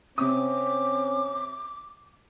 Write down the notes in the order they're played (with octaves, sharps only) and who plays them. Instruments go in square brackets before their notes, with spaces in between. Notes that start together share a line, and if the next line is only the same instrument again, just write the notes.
[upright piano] C3 D#6 [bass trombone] C4 [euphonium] C#4 [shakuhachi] D6